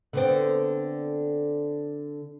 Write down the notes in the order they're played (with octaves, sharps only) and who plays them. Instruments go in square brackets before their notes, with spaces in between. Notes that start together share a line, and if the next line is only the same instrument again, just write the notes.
[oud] D3 B3 C4